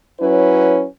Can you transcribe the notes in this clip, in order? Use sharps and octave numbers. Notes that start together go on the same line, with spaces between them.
F#3 C#4 E4 B4